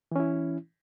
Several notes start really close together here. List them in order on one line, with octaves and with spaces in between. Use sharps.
E3 C#4 E4